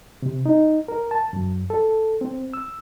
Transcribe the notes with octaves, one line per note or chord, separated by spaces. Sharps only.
C3
D#4
A#4
A5
F#2
A4
C4
E6